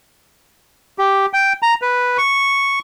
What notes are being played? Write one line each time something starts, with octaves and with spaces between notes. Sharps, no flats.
G4
G5
A#5
B4
C#6